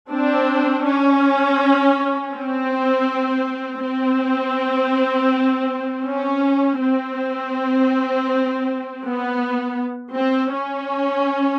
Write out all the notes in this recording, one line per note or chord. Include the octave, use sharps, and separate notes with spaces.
C4 D4
C#4
C4
C4
C#4
C4
B3
C4
C#4